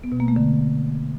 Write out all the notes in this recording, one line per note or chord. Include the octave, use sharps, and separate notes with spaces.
B3
B2
A#3
A3
D3